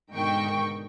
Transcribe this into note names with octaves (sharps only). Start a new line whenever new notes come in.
G#2 B2 D3 D#3 G5 C#6